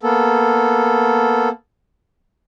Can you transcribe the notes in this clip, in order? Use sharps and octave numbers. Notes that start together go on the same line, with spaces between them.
A#3 B3 A4